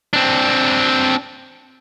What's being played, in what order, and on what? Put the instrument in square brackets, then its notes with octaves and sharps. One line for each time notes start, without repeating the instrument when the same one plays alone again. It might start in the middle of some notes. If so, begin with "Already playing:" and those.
[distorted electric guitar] C4 D4